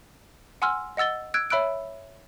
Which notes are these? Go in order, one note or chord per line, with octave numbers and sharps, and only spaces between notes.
F#5 G#5 C6 E6 F6
D#5 F#5 E6 A6 G7
E6 F#6 G#6 D7
C#5 E5 B5 E6 F#6 D7